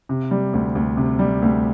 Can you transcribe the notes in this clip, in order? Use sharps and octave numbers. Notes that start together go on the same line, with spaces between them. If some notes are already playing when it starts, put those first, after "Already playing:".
C3
G3
D2
D2
C3
G3
D2